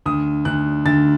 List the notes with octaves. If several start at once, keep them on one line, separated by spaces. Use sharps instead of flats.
D2 D#6
D2 F#6
D2 A6